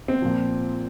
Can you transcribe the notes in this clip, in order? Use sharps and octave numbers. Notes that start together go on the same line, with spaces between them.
C4
A#2 F3